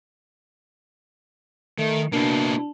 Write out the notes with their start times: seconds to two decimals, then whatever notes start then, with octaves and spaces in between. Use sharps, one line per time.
1.79 D#3 A3
2.13 B2 A#3 D4 E4